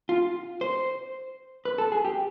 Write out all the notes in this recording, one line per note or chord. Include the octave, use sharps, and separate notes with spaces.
F4
C5
B4
A4
G#4
G4